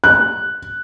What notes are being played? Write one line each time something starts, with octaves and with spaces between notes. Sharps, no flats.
F#6